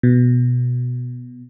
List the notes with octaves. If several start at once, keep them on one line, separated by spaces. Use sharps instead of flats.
B2